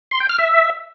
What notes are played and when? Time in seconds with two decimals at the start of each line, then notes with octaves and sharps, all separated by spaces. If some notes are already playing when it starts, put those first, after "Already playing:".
0.11 C6
0.20 G5
0.29 F6
0.38 E5